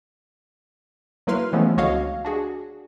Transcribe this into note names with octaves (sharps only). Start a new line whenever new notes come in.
F#3 A#3 E4 B4 C6 F6
E3 F3 G#3 A3 B3 C#4
C#2 D3 F#4 C#5 D#5 F5
D4 F#4 G#4